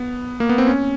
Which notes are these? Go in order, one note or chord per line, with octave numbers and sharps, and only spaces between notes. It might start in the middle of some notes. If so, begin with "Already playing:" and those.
Already playing: B3
A#3
B3
C4
C#4